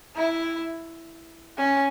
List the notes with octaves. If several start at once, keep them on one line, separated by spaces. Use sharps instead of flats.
E4
C#4